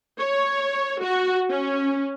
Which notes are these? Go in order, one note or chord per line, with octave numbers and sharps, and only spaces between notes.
C#5
F#4
C#4